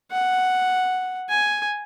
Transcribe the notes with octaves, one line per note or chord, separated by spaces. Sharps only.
F#5
G#5